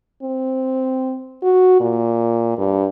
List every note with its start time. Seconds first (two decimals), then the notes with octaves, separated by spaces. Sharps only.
0.22 C4
1.43 F#4
1.80 A#2
2.58 G2